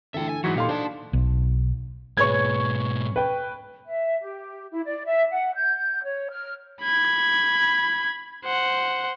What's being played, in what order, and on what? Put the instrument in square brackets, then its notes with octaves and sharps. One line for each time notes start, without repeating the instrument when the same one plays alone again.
[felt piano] D3 E3 A3 [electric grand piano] A4 [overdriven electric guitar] E5 G5
[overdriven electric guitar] G#5
[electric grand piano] G#2 F#3 F#4 [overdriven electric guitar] E3 [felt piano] G#6 B6 C#7
[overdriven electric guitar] A#2 [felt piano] D#4 A4 C6 [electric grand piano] G4 F5
[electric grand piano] D4 [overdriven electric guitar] C5 A5
[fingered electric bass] B1
[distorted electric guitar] G#2 B2 [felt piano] G#4 B4 C#5 [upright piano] C#6 G#6
[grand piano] B4 G5
[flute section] E5
G4
E4
D5
E5
F#5
G6
C#5
F6
[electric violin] B5 G#6
C5 F#5